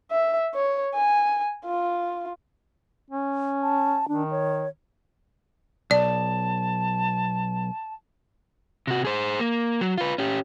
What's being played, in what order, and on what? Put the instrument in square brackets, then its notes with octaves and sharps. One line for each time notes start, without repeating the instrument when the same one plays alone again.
[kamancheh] E5
C#5
G#5
F4
[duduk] C#4
[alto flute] A5
[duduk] D#3 [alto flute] D4
[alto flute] C#5
[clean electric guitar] B1 [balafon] D5 [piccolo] A5
[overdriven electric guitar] C3 F#4
G#4 C5
A#3
F#3
F4 B4
C#4 G4